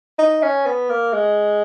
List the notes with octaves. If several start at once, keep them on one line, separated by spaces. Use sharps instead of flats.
D#4
C#4
B3
A#3
G#3